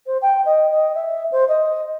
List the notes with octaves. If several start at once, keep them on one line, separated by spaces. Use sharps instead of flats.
C5
G5
D#5
D#5
E5
C5
D#5